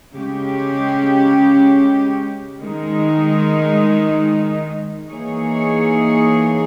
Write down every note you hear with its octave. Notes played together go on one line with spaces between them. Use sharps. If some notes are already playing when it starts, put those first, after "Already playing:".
C#3 G#3 C#4 G4
D#3 G#3 D#4
E3 A#3 D#4 G#4 C#5